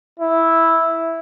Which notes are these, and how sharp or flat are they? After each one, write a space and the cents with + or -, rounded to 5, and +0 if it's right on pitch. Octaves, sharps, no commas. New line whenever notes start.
E4 -5